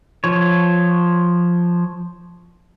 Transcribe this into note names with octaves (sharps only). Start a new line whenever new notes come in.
F3 C#5